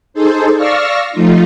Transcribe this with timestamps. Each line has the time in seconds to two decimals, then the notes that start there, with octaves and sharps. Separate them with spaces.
0.14 D#4 G#4 A4 C5
0.55 D5 F5 C#6 E6 F6 A#6
1.11 F3 A3 D#4 F4